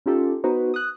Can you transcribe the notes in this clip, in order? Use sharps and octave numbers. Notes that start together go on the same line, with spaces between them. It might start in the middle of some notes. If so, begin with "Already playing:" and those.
C#4 D#4 F4 G4 A4
B3 D#4 F#4 B4 C5
D#6 F#6